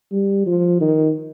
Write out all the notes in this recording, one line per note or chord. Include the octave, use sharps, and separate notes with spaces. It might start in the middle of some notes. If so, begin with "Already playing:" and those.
G3
F3
D#3